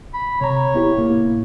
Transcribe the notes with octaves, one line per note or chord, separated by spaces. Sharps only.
B5
C3 C#5 A#5
B3 E4 G4
A2 A#3 E4